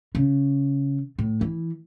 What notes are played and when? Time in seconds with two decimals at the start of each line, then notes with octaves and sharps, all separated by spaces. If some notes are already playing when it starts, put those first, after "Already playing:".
0.15 C#3
1.19 A2
1.41 E3